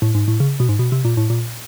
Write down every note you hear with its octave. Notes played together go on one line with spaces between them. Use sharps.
A2
G#2
A2
C#3
B2
G#2
B2
C3
A#2
A2
A#2